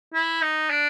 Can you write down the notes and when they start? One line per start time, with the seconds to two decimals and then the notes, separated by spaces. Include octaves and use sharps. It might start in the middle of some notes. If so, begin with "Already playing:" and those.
0.14 E4
0.42 D#4
0.70 D4